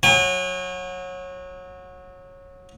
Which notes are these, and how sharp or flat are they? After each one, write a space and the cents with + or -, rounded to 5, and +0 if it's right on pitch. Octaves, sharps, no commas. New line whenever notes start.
F#3 -20 G#5 -45